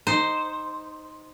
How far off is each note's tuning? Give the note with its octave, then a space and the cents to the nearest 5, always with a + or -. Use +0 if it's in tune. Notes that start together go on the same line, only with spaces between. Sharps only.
D#4 +0 C5 +0